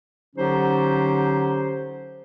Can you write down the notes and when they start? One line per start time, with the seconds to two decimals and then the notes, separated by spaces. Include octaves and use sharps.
0.36 D3 F#3 C#4 D#4 G4 C5